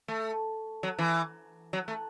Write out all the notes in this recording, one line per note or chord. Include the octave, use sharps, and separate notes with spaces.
A3
F#3
E3
F#3
A3